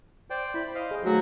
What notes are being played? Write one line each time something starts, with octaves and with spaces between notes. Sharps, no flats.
C5 D5 G5
E4 B5
C5 D#5 F5
G#4
D#3 F3 F#3 A3 F#4 G#4